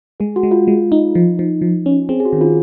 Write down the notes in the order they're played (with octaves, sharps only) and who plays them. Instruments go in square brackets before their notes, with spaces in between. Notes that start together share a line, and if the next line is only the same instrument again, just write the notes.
[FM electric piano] G#3 [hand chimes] G#4
[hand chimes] F#4
[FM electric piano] G#3
[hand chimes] F4
[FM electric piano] G#3
D#4
F3
F3
F3
C#4
[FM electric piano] C4 [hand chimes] G#4
[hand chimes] G#4
F#4
[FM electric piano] D#3
[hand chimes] F4